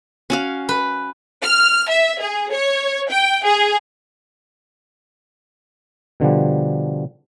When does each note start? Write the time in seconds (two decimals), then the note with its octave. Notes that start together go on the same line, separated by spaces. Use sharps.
0.30 C#4 F#4 F5
0.69 B4
1.42 F6
1.89 E5
2.20 G#4
2.52 C#5
3.09 G5
3.45 G#4
6.20 B2 D3 F3 G3